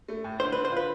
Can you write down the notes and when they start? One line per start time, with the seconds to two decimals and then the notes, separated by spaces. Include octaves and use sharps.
0.08 A3
0.24 A2
0.40 D3 C5
0.52 D3 B4
0.65 C5
0.72 F4 B4